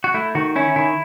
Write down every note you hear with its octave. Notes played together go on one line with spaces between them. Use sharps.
F#4
A3 E4
D#3 F#4
C#4 E4
D#3 E4